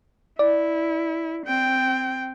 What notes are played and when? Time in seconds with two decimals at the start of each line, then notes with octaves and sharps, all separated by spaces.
0.39 E4 D5
1.47 C4 G5